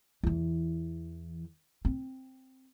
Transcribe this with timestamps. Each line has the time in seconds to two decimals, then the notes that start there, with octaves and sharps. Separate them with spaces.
0.23 E2 E3
1.85 C4